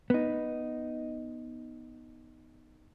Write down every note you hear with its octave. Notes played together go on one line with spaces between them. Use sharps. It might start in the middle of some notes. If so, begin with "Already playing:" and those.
B3 D#4